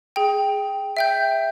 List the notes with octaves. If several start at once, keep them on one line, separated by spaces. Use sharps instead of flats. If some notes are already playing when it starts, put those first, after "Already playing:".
G#4 G5
E5 G5 G6